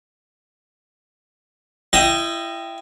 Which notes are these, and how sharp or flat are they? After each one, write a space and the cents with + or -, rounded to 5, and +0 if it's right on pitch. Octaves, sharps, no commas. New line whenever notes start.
E4 +30 D#5 +0 G5 +0